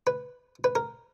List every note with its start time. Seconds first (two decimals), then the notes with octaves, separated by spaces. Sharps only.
0.07 B4
0.64 B4
0.75 A#4